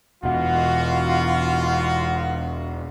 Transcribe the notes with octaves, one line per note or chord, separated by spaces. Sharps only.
E1 B2 E3 D#4 F4 F#4 F#5